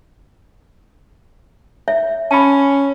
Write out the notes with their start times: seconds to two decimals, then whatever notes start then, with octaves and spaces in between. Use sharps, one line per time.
1.88 C#5 E5
2.31 C#4 A5 B5